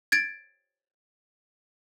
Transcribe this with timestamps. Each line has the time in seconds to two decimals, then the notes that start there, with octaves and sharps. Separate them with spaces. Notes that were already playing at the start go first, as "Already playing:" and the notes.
0.12 G#6 A6 D7